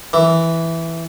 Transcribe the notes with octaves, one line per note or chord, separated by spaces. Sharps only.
E3